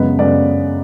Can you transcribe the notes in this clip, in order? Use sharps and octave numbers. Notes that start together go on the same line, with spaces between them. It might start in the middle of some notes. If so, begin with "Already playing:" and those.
Already playing: F#2 C#3 G#3 B3 B4
F#2 C#3 G#3 B3 D5